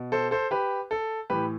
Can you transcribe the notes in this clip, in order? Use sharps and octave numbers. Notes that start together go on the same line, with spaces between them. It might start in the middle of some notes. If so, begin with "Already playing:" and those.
Already playing: B2
A4 C5
A4 C5
G4 B4
A4
A2 E3 G4 B4